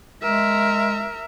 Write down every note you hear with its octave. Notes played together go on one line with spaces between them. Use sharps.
G#3 A#4 E5